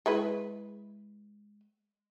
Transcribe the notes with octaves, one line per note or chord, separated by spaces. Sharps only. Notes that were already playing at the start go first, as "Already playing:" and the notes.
G#3 E4 B4